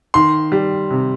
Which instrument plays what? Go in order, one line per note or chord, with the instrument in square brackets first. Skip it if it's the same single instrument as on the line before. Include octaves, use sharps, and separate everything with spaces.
[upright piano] D#3 C6
G3
C3